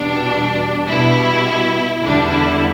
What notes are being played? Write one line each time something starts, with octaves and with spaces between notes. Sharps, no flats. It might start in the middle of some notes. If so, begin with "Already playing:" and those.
Already playing: E2 B2 G3 D4
B2 G3 E4
E2 D3 G3 D4
E4